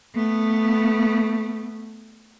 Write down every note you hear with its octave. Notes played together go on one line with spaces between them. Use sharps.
A3 B3